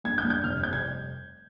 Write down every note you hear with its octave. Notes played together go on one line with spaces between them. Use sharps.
G2 G#6
G6
G2
G6
F1 F6
F1 G6
G#6